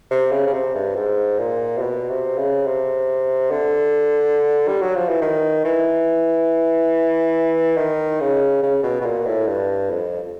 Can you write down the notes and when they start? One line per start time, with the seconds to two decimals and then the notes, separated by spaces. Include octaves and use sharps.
0.11 C3
0.32 C#3
0.47 C#3
0.54 C3
0.75 G2
0.96 G#2
1.38 A#2
1.78 C3
1.81 B2
2.09 C3
2.38 C#3
2.67 C3
3.51 D3
4.68 G3
4.82 F#3
4.95 F3
5.09 E3
5.22 D#3
5.65 E3
7.77 D#3
8.20 C#3
8.63 C#3
8.83 B2
9.01 B2
9.05 A#2
9.26 A2
9.47 G2
9.90 F2